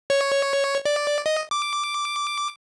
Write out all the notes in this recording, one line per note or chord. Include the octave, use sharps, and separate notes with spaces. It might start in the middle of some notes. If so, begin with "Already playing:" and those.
C#5
D5
D#5
D6